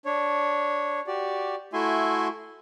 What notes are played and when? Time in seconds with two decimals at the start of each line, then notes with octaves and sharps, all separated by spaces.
0.06 D4 C#5
1.07 F#4 G4 D5
1.73 A3 E4 F#4 E5 G#5 C6